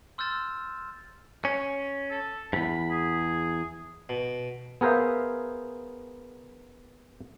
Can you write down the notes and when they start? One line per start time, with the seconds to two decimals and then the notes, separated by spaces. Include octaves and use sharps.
0.18 C6 E6 F6 G6 A6 E7
1.45 C#4
2.11 A4
2.53 E2 G2 B5
2.91 G#4
4.09 B2
4.81 B3 G#4 A#4 C5 E5 F5